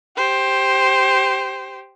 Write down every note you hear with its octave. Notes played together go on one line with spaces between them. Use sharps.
G4 C5